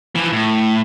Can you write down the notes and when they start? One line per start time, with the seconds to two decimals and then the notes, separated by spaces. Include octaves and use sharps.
0.15 E3 F3
0.33 A2